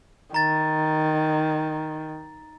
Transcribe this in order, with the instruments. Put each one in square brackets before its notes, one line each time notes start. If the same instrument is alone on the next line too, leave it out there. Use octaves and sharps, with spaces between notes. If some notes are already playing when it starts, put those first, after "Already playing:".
[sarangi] D#3 [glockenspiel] A#5 A6